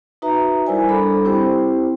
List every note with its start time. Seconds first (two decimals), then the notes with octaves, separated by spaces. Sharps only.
0.22 D#4 F#4 B4 E5 A#5
0.67 G3 E4 A#4 C5 D5 G#5
0.89 G3 D4 A4 B5
1.24 C4 E4 G4 C5 G5